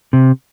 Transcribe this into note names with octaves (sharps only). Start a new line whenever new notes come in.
C3